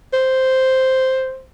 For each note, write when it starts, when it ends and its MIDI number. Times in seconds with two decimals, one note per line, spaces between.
0.13 1.42 72